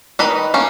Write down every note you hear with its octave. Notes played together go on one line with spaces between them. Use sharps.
D#3 B4 D#5
A#3 C#4